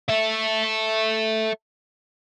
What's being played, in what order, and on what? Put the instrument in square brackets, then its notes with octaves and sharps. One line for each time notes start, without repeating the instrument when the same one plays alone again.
[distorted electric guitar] A4 E5